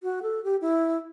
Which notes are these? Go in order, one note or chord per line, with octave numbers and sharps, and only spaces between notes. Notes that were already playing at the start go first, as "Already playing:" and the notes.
F#4
A4
G4
E4